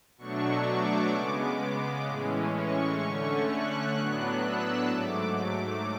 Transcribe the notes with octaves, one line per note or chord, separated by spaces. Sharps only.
B2 F#3 A3 D4 C#6
D6
C#3 G#3 B3
A2 E3 G#3 C#4
C#6
D3 A3 C#4
F#6
A2 F#3 B3 D4
E6
G#2 F#3 A3 D6